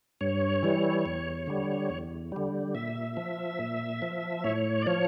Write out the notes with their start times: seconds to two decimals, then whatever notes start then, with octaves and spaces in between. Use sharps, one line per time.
0.21 G2 C#5
0.63 E3 G3
1.06 E2
1.47 D3 G3
1.90 E2
2.32 D3 G3
2.75 A#2 E5
3.17 F3
3.59 A#2
4.02 F3
4.44 A2 C#5
4.82 D5
4.86 F3 C#5